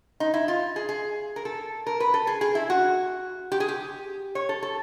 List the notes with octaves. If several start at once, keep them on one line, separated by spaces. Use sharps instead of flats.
D#4
E4
F4
G#4
G#4
A#4
A4
A#4
B4
A4
G#4
G#4
E4
F#4
G4
G#4
G4
C#5
A4
A4